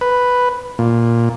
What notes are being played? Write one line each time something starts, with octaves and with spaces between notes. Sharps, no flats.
B4
A#2